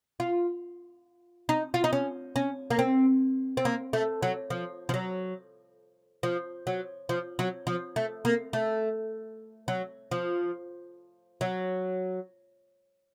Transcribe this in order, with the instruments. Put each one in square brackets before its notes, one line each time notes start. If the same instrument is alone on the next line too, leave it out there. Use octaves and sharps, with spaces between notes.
[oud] F4
D#4
F4
D#4
C#4
C#4
A#3
C4
C4
A#3
A3
F#3
F3
F3
F#3
F3
F#3
F3
F#3
F3
A3
A#3
A3
F#3
F3
F#3